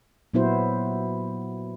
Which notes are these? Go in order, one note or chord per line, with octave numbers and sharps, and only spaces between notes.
A#2 F#3 B3 E4 F#4 C5